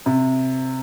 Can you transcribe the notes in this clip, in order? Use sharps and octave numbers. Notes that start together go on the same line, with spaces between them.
C3